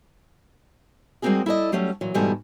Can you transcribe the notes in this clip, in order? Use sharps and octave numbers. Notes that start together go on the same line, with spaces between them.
G3 G#3 A#3 C4 F#4 G#4
E4 A4 D5 D#5
F#3 G3 A3 C#4
A#2 E3 F#3
E2 G#2 B2 G3 A4 G#5